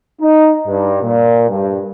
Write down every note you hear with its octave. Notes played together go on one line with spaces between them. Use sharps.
D#4
G2
A#2
G2